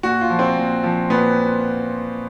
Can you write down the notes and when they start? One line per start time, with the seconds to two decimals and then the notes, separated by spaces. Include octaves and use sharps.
0.03 A#2 F#4
0.21 F4
0.30 F3
0.39 C4
0.57 A#2
0.84 F3
1.10 A#2 B3